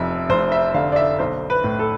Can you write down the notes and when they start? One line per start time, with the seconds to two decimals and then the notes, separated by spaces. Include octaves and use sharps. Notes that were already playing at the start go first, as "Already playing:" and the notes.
Already playing: F1 F2 E5
0.29 F1 C5
0.52 E5
0.74 D3 F5
0.92 D5
0.96 E5
1.19 B1 C5
1.50 B4
1.64 A2
1.79 A4